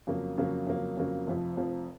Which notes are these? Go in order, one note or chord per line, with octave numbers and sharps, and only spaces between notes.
F2 C#3 F#3 A#3
F2 C#3 F#3 A#3
F2 C#3 F#3 A#3
F2 C#3 F#3 A#3
F1 F2 F3
F1 F2 F3